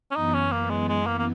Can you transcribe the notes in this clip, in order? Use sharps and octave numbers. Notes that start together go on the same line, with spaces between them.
C#4
F#2 E3 B3 D#4
C#4
A#3
G#3
G#3
A#3
A#3